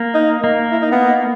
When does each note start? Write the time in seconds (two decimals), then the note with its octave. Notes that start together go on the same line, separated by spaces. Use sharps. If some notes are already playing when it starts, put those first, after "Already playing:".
Already playing: A#3
0.14 D#4
0.44 A#3
0.72 E4
0.82 D#4
0.92 B3